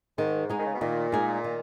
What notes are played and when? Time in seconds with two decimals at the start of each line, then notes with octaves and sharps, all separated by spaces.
0.18 G#2 D#3
0.50 G#3 D#4 G#4
0.58 D#3
0.65 C#3
0.74 B2
0.81 A#2 D#3
1.12 G#3 D#4 G#4
1.44 D#3